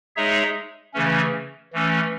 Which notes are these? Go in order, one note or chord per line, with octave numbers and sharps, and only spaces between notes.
G#3 D#4 G#4 C#5 E5
C#3 E3 A3 C#4
E3 A3 C#4